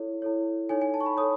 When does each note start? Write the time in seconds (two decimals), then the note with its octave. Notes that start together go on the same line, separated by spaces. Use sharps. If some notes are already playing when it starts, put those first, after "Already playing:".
Already playing: E4 A4 C#5
0.22 E4 A4 C#5
0.69 D#4 A4 C#5 G#5
0.82 G#5
0.94 A5
1.00 C#6
1.06 B5
1.17 A4 C#5 D#6